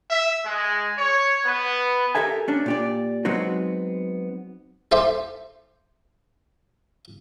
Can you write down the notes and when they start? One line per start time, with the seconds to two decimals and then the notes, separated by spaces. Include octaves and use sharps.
0.10 E5
0.45 G#3
0.98 C#5
1.46 B3
2.15 G4 A4 A#4 E5 G#5
2.48 C#4 D4
2.66 A#2 G4 D5
3.25 F#3 G#3 B3 C4 D#4 F#4
4.92 A4 C5 E5 C6 D6